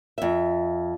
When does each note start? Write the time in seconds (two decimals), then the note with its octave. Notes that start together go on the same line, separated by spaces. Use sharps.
0.18 F2 E5